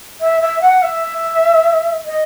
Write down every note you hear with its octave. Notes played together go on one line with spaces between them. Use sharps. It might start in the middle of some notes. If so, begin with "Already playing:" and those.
E5
E5
F#5
E5
D#5